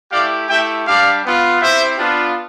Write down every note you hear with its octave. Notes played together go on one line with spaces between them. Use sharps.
A3 E4 G4 D5 F5
A3 E4 G4 E5 G5
G3 D4 G4 D5 F5
B3 F4
C4 E4 G4 C5 E5
B3 D4 F4